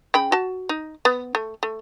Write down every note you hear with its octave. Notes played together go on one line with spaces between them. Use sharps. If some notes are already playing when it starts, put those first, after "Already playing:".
C#3 G5 B5
F#4 A5
D#4
B3
A3
A3